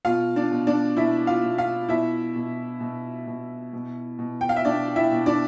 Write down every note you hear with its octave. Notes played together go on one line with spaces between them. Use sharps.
B2 F4 F5
D4 D5
B2
D4 D5
B2 E4 E5
F4 F5
B2
F4 F5
B2 E4 E5
B2
B2
B2
B2
B2
G5
F5
E5
B2 D4 D5
E4 E5
B2
D4 D5